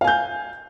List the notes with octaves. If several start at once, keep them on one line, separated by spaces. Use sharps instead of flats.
F5 G#5 G6